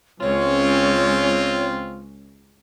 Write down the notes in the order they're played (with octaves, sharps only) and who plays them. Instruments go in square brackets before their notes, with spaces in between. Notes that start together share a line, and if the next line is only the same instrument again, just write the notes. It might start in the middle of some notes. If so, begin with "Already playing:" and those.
[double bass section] C#2 G#3 C#4 [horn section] C4 F4 [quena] C#5